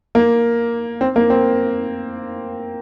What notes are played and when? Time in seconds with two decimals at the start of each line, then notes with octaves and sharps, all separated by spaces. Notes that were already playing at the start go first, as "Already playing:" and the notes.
0.15 A#3
1.01 C4
1.16 A#3
1.30 C4